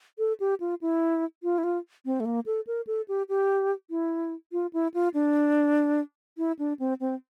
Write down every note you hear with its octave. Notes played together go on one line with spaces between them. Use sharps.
A4
G4
F4
E4
F4
E4
F4
C4
A3
A#3
A4
A#4
A4
G4
G4
E4
F4
E4
F4
D4
E4
D4
C4
C4